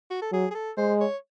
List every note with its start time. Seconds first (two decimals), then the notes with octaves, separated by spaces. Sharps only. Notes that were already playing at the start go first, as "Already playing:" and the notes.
0.10 F#4
0.22 A4
0.32 F#3 G#4
0.51 G#4
0.55 A4
0.78 G#3 C5
1.01 C#5